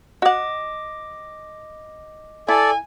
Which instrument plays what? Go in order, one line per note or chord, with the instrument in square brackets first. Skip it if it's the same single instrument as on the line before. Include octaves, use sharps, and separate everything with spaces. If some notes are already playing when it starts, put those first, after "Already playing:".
[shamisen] F#4 F#5 [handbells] D#5 D6
[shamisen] E4 [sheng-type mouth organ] A4 D5 [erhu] G#5